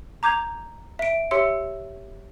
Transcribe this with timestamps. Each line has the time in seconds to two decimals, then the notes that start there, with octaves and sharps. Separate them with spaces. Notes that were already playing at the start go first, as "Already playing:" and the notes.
0.23 A#5 D6 G6 G#6 F7
0.99 E5 D7
1.31 G4 C#5 E5 C6 E6 C#7